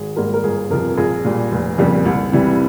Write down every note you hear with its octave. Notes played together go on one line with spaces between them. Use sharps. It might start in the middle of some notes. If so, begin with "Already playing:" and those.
Already playing: G#1 G#4
G#2 G3 A#3 A#4
A#4
G1 G#4
F2 C3 F3 A#4
A#1 G#4
A#2 G3
F1
F2 C#3 G3 A#3
C2
C3 E3 G3